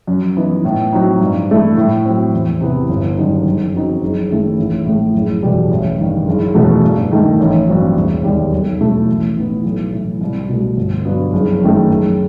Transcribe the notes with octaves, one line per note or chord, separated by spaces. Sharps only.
F#2
E3 B3 D#4
A2
F#3 C4 D#4
G2
E3 A3 E4
A2
F#3 C4
E2
C3 E3 B3 E4
G1
F#2 D#3 G3 D#4
F#1
F#2 F#3 C4 D#4
F#1
F#2 D#3 A3 E4
A1
A2 E3 A3
F#1
E2 B2 G3
A1
G2 D#3
F#1
E2 B2 F#3 A3
G2
D#3 A3 D#4
A1
G2 F#3 C4
E1
D#2 D#3 G3
B1
B2 A3 E4
A1
A2 E3 B3 D#4
B1
A2 E3
C2
B2 A3
G1
G2 F#3 B3
F#1
F#2 D#3 A3
F#1